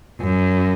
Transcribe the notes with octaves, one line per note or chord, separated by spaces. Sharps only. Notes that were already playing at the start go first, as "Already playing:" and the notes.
F#2